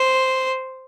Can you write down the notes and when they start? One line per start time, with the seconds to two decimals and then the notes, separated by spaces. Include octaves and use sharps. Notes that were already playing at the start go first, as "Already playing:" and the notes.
Already playing: C5